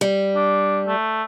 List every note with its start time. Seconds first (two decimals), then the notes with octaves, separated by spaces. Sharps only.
0.01 G3
0.35 D4
0.87 A3